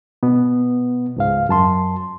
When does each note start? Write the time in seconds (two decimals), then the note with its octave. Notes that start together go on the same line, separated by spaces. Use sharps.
0.23 B2 B3
1.16 C#2 G#2 F5
1.49 F#2 A5 C6